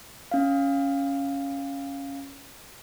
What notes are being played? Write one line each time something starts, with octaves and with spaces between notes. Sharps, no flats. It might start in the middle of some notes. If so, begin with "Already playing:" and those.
C#4 F5